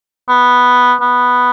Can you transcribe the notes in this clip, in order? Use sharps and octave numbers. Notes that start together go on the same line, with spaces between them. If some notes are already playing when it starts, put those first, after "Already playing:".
B3
B3